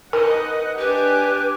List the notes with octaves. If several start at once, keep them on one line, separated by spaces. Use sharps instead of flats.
D#4 A#4 B4 D#5 F#5
D4 G4 B4 G#5 D6